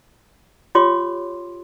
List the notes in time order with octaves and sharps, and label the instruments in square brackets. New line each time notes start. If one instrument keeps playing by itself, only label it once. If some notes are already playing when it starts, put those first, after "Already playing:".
[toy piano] F4 G4 C#5 C6 D6